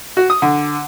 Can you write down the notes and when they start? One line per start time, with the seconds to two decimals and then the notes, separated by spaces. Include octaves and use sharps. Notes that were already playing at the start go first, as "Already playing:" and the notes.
0.17 F#4
0.30 D#6
0.42 D3